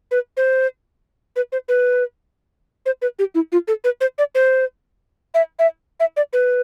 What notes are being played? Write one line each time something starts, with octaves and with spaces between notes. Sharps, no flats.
B4
C5
B4
C5
B4
C5
B4
G4
E4
F4
A4
B4
C5
D5
C5
E5
E5
E5
D5
B4